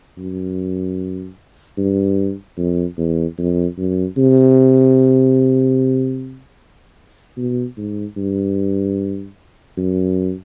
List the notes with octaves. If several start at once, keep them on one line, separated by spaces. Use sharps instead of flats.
F#2
G2
F2
E2
F2
F#2
C3
B2
G#2
G2
F#2